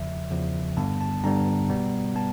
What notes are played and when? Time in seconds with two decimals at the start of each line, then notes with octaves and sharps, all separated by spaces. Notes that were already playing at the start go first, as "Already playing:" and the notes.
Already playing: E2 C#3 F3 E5
0.31 E2 C#3 F3
0.77 G2 D3 G3 B3 A5
1.01 A5
1.24 G2 D3 G3 B3 A#5
1.70 B2 G3 B3
2.16 B3 A5